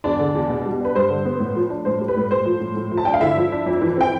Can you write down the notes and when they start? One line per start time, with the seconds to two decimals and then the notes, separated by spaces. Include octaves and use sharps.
0.04 E2 D4 D5
0.19 D3
0.35 E2
0.49 B2
0.65 G3
0.81 D4 B4
0.95 G2 C5
1.10 D3
1.25 B3
1.40 A2
1.56 F3
1.70 D4
1.85 A2 C5
2.01 G3
2.08 B4
2.16 A2
2.31 A2 C5
2.45 F3
2.60 A2
2.76 A2
2.91 F3
2.98 A5
3.05 D4 G5
3.14 F5
3.21 D3 E4 E5
3.37 F3
3.52 D4
3.66 F2
3.82 E3
3.97 C4 G5